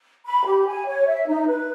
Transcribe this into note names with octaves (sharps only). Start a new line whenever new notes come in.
B5
G4
G#5
C#5
E5
D#4
B4